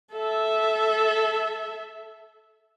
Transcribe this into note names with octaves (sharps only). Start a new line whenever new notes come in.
A4 E5